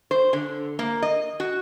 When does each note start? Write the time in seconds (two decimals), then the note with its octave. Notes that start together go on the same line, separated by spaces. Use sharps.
0.11 C5
0.33 D3
0.79 A#3
1.02 D#5
1.40 F#4